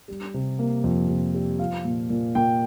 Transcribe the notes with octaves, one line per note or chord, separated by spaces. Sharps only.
G3
C3
A#3
F2
C3
G3
F3 F5
A#2
A#2
A#2 G5